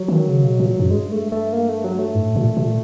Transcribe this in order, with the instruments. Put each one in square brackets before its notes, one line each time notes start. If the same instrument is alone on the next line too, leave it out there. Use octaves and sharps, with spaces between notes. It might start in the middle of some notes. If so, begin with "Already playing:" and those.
Already playing: [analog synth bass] F#3
[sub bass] D#3
C#3
B2
A#2
F#2
[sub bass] G2 [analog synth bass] G#3
[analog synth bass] A3
A3
A#3
A3
F#3
A3
[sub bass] A2
A#2
A#2